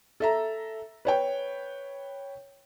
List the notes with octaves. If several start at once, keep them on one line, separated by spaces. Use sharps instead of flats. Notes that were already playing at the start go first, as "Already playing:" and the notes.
A4 E5 A#5
B4 C#5 G5